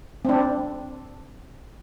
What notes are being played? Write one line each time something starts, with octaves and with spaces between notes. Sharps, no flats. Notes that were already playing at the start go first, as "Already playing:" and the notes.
C4 D4